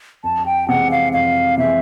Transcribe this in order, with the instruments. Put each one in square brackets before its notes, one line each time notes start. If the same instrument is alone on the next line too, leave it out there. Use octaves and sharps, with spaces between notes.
[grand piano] F2 [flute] A5
[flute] G5
[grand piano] C3 E3 G#3 [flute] F#5
[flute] F5
[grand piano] F2 [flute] F5
[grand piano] C3 E3 G#3 [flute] E5